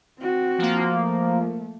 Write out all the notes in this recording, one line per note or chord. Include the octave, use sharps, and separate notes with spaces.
C4 F#4
F3 A#3
A3